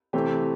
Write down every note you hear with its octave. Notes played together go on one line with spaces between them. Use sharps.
C3 E3 A3 C4 G4